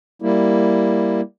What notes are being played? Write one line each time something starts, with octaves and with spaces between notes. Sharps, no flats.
G3 A#3 E4